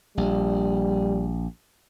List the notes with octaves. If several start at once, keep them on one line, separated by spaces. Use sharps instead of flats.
A#1 G3